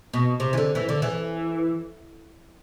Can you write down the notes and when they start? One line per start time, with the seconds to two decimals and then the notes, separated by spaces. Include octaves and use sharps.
0.13 B2
0.40 C3
0.53 E3
0.58 D3
0.75 E3
0.89 D3
1.02 E3